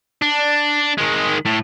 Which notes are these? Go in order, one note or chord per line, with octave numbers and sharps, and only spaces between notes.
D4
D#3 G#3
A2